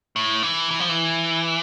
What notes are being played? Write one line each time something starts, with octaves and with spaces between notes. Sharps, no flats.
A2
E3
E3
F3
E3